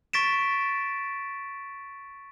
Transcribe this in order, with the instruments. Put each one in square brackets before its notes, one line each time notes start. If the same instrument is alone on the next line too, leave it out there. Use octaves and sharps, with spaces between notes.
[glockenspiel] C#6 A6 B6 D7 E7